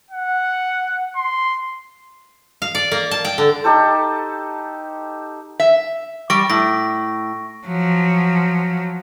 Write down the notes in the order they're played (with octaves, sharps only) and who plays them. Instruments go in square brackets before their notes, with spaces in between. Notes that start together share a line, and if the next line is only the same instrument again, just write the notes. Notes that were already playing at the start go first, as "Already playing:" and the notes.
[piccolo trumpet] F#5
C6
[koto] F5
D5
A#3
A5
G5
D3
[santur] D#4 G4 A4 C5
[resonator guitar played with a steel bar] E5
[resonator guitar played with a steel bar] G3 [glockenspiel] C#6 A#6 D7
[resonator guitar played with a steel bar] A2 [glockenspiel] A#6
[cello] F3 F#3